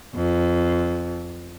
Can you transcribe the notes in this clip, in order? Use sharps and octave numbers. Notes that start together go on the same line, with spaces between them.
F2